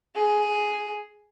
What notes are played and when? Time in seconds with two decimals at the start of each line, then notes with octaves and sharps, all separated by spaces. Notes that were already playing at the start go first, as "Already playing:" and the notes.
0.15 G#4